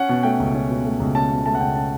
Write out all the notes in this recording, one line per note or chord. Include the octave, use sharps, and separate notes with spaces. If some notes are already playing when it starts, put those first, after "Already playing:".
Already playing: C#4 F#5
B2
A3 G5
C#2
C#4
B2
A3
C#2
C#4 A5
B2
A3 A5
F#5
C#2 G5
C#4 A5